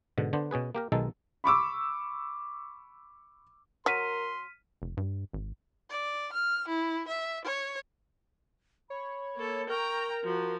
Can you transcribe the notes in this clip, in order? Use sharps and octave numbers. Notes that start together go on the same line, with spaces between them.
G#2 B2 D3
D3 B3 D4 C5
B2 C#4 G#4 B4
A#3 G4 A#4
B1 B2 D#3 G#3 D#4 A4
B5 C#6 D6 E6
F#3 A#4 C6 F6 B6 D#7
F1
G2
G#1
D5
F6
E4
E5
C#5
C#5 B5
A#3 A4
A#4 G5 A#5 C#6
F3 F#4